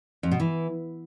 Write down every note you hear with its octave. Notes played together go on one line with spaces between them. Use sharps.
F2
B2
E3